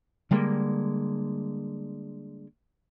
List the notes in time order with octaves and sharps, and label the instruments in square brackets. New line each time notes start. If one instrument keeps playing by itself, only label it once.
[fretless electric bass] D3 G3 G#3 A#3